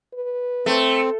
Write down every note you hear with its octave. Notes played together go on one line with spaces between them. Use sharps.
B4
A3 C4